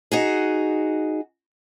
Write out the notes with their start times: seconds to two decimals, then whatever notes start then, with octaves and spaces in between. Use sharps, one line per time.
0.12 D#4 F#4 G#4